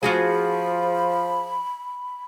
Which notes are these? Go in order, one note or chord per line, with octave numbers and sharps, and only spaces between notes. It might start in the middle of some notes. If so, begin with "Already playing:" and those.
F3 F4 F#4 G#4 B5